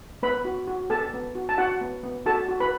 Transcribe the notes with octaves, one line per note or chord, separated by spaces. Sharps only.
B3 B4 B5
F#4
F#4
B3 A4 A5
B3
F#4
A5
F#4 F#5
B3
B3
F#4 A4 A5
F#4
B4 B5